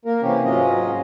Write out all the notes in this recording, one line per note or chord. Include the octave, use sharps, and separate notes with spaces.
A#3 A#4
C3 E3 A#3 C#4 G4
G#2 F#3 G#3 C#4 F4 D#5